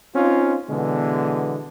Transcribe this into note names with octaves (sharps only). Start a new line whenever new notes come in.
C4 C#4 D#4 F4
B2 D3 E3 G#3 B3